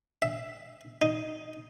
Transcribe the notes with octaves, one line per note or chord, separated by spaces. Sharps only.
E5
D#4